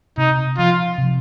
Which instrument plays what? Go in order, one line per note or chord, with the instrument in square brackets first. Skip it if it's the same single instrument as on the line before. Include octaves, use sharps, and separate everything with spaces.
[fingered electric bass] C3 [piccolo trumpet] D#4
[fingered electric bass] F3 [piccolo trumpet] F4
[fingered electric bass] C3